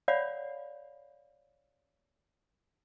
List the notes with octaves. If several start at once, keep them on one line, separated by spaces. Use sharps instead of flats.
C#5 D5 F5 F#5 B5